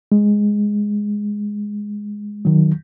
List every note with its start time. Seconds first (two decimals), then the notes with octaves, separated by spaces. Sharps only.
0.12 G#3
2.45 D#3 F#3